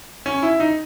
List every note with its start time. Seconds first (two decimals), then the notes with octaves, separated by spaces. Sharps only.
0.26 C#4
0.42 E4
0.60 D#4